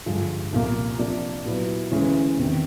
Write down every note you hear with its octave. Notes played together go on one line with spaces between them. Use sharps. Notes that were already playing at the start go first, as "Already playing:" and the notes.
G2 D3 F3 G#3
C2 A#2 F3 A#3
C3 F3 A#3 D4
A#2 F#3 B3 E4
D2 C#3 E3 G#3 C#4
E2 C3 D#3